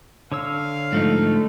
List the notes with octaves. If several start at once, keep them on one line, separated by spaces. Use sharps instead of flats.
D3 C#5 F5 E6
G#2 F3 A3 D#4